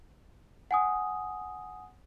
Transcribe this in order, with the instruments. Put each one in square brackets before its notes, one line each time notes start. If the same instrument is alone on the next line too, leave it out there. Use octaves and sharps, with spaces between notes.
[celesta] F#5 G#5 D#6